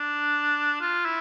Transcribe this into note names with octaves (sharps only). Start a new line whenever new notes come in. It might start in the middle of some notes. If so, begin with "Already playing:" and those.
Already playing: D4
F4
E4